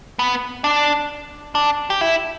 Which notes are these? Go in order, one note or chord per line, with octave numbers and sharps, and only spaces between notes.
B3
D4
D4
G4
E4